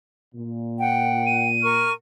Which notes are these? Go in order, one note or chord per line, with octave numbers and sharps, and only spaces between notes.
A#2
F#5 G5
D#7
A#4 C#6 F6